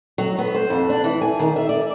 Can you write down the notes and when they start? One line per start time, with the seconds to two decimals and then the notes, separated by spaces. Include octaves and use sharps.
0.18 F#3
0.39 B3
0.55 C5
0.70 F2
0.90 D4
1.04 E3
1.21 G#5
1.39 D#3
1.56 E5
1.69 D5